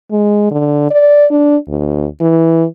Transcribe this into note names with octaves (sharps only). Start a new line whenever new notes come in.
G#3
D3
D5
D4
D2
E3